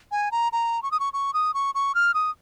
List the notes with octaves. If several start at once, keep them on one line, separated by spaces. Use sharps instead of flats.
G#5
A#5
A#5
C#6
D#6
C#6
C#6
D#6
C#6
C#6
F6
D#6